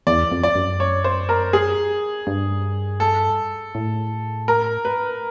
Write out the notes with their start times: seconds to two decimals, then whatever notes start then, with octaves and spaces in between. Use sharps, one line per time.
0.07 E2 D5
0.31 F2
0.43 D5
0.55 F#2
0.80 C#5
1.04 C5
1.29 A#4
1.53 G#4
2.27 G2
3.00 A4
3.75 A2
4.48 A#4
4.85 B4